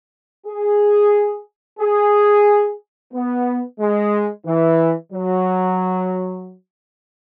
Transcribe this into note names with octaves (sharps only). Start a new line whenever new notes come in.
G#4
G#4
B3
G#3
E3
F#3